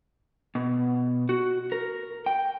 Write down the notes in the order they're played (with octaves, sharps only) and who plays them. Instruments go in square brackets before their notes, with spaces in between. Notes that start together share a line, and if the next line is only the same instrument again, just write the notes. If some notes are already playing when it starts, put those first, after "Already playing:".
[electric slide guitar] B2
F#4
A#4
G5